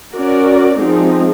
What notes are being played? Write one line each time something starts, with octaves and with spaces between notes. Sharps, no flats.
C#4 F#4 A#4 D5
F3 G#3 C4 D#4 G#4